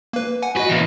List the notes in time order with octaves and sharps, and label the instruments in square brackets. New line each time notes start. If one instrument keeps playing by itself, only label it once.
[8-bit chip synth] A#3 B4
F#5 G#5
[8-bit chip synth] F#4 D#5 [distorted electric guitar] B4
[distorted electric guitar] A#2 E3 [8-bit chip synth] A#6